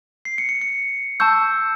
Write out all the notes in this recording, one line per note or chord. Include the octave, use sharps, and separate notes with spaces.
C7
C#7
C#7
C#7
A5 C#6 E6 G6